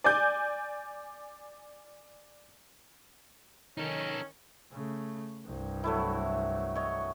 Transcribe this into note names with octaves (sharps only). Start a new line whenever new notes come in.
D5 G#5 G6
D#3 C#4 D#4 A4
C#3 A3
C2 G2
F#3 A3 E4
C#5 D#5